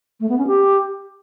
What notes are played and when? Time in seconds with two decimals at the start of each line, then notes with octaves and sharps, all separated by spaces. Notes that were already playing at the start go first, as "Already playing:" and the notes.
0.20 A3
0.29 B3
0.38 C#4
0.47 G4